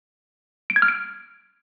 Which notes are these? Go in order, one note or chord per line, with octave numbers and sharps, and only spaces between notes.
D7
G#6
F6
D7